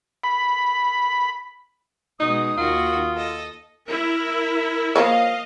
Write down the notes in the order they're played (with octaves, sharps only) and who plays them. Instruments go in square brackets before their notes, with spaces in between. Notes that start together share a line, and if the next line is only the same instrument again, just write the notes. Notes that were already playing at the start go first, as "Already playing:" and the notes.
[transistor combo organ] B5
[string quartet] B2 G#3 [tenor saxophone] D#4 [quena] D#6
[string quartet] D#2 D#3 F#4 [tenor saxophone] F4
[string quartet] A4 D#5
[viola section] E4 A#4
[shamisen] F3 A#3 C#5 [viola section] D#5 F5